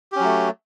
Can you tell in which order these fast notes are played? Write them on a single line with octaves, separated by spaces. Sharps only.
G4 C#4 F#3 A3